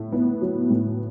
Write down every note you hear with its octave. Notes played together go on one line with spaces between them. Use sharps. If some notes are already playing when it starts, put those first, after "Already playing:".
Already playing: A2 E4
B3
F#3
A2